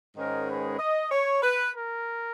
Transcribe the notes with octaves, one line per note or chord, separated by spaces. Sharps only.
G#2 D#3 G#3 C#4 A#4
B4
D#5
C#5
B4
A#4